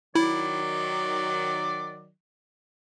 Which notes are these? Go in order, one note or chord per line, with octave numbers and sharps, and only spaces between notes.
D#3 F#3 E4 D5